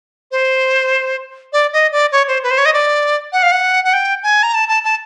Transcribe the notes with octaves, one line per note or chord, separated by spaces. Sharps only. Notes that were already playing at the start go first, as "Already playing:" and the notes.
C5
D5
D#5
D5
C#5
C5
B4
C5
C#5
D#5
D5
F#5
F5
F#5
F#5
G5
G#5
A#5
A5
A5
A5